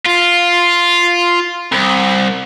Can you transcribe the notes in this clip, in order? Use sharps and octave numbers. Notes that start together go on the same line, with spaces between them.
F4
C2